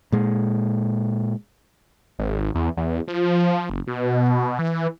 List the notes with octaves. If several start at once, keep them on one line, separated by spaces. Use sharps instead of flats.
A#2 G#3
G#1
E2
E2
F3
F#1
B2
E3